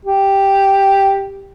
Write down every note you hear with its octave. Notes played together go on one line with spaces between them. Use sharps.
G4